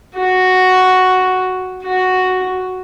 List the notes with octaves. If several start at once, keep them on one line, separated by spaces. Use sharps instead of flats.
F#4
F#4